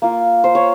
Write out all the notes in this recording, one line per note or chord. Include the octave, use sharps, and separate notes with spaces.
A#3 F4
C5
C#5